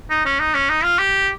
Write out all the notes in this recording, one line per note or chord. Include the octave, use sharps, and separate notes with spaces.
D#4
C#4
D#4
C#4
D#4
F4
G4